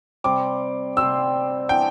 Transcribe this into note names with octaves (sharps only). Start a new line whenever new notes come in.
C3 G3 C4 D6
C3 G3 C4 E6
E3 B3 D4 G5